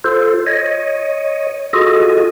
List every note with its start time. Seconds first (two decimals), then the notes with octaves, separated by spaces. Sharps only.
0.04 F4 A4 C5
0.47 C#5 D#5
1.73 F4 F#4 G#4 A4 D#5